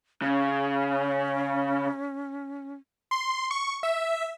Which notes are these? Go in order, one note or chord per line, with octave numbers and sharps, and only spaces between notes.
C#3 C#4
C6
C#6
E5